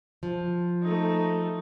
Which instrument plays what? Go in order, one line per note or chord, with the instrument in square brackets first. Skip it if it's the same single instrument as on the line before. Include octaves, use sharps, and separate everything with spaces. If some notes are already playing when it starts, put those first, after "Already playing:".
[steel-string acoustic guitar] F3
[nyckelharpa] A3 D#4